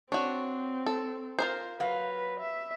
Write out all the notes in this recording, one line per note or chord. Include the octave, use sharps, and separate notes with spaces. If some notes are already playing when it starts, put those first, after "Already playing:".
C4 D4 F#4 C#5
A4
F4 A#4 C5
F#3 B4 F5
E5